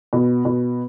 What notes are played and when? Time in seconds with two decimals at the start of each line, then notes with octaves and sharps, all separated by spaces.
0.13 B2
0.45 B2